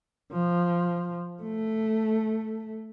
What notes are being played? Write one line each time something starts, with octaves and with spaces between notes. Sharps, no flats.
F3
A3